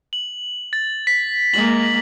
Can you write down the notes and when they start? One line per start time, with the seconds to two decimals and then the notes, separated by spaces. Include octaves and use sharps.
0.13 F#7
0.73 A6
1.07 B6
1.54 G#3 A#3 F#7